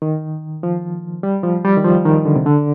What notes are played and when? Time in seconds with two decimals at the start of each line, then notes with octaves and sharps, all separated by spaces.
0.02 D#3
0.63 F3
1.23 G3
1.44 F3
1.65 G3
1.77 D#3
1.85 F3
2.05 D#3
2.25 D3
2.36 C3
2.46 D3